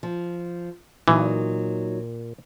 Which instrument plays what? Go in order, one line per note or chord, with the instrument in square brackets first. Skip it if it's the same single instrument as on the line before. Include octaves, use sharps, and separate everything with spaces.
[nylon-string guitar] F3
[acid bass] A#2 [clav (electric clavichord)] E3 [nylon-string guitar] F#3 D#4